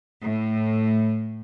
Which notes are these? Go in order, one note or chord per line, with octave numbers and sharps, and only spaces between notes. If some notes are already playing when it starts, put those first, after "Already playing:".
A2